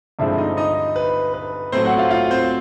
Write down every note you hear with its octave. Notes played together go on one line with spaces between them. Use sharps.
G2 D3 F3 G#3 C4 E4 E5
D#4 D#5
D#4 D#5
B4
B4
A2 F#3 A3 C4 C5
F#4 F#5
F4 F5
F4 F5
C4 C5